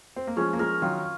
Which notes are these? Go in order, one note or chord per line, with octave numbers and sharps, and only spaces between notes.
C4
A#3
F3 G#3 C#4
A#3
F3 G#3 A#4
D#3 F#3 F4